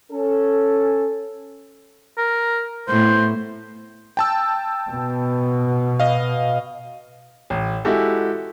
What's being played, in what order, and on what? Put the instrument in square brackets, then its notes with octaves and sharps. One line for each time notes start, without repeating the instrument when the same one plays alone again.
[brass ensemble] C#4 A4
[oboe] A#4
[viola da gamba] A2 B3 [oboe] C5
[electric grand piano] G5 A5 E6
[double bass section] B2
[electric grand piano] D#5 F5
[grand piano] A1
G#3 E4 F#4 G4 A4